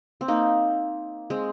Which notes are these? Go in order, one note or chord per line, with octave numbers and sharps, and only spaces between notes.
C4
A#3 D#4
G#3 C4